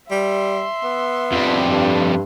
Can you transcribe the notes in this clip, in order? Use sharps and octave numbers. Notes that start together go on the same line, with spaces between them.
G3 E5 C6
B3
F2 G3
G2